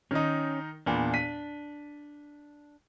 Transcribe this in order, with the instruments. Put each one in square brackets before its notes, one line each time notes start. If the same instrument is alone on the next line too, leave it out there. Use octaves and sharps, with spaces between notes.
[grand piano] D#3 D#4 [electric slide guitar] C#4
[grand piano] E2 A#2 B5 [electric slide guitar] D4
[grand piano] B6 D#7